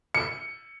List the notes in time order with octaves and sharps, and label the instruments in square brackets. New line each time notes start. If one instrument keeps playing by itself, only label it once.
[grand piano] C#7